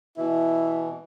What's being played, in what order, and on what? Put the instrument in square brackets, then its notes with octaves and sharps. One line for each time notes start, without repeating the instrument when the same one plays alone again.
[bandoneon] B2 E3 [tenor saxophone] E4